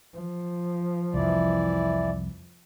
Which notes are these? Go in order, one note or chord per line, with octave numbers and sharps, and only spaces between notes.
F3
C2 F2 E3 E4 D5